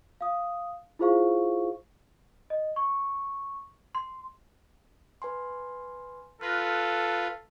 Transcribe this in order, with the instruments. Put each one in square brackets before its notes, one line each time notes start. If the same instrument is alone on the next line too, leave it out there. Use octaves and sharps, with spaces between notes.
[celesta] F5 D#6
E4 F4 G#4 C5 F5 C#6
D#5
C#6
C6
[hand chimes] B4 G#5 C6
[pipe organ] F4 B4 [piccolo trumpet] A4 [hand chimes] F6 F#6 A#6